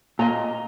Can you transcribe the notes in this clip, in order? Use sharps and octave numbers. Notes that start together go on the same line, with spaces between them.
A#2 D#5 A#5